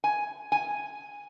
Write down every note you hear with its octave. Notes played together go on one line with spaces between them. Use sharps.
G#5
G#5